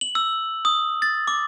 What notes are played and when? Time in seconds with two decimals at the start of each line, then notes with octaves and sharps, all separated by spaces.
0.01 F#7
0.15 E6
0.65 D#6
1.02 A6
1.28 D6